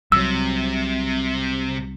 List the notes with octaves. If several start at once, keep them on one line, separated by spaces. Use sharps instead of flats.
C2 C3 F#3 E6